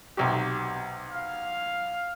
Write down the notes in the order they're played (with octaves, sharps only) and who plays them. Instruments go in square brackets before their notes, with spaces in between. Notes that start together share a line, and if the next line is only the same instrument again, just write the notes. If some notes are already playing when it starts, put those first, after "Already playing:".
[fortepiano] B1 C3 G4
[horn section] F5